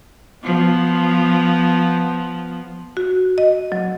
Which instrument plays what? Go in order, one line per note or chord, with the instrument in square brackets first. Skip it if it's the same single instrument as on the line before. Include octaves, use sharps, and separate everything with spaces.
[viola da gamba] F3 B3
[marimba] F#4
D#5
F#3